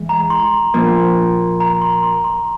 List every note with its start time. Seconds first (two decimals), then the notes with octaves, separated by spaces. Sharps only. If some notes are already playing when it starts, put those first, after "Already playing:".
Already playing: E3 G#3
0.09 A#5
0.30 C6
0.74 A#2 F3 A#3
1.60 A#5
1.81 C6
2.03 C6
2.24 C6